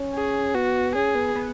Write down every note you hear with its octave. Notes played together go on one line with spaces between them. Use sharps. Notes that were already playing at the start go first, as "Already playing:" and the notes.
Already playing: C#4
G#4
B3 F#4
C#4 G#4
B3
B3